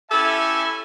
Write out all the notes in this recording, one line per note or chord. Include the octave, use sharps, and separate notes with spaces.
C#4 E4 G4 A4 E5 G#5